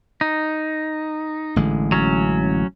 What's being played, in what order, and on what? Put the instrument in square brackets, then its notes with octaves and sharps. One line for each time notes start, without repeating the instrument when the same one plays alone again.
[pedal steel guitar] D#4
[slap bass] A1 D3 G#3
[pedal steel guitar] F#3 C#4